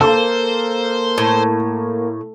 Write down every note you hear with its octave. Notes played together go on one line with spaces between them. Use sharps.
A#3 A4 C5
A2